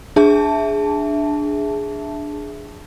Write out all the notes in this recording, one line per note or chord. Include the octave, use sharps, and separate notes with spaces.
D4 G#4 E5 A5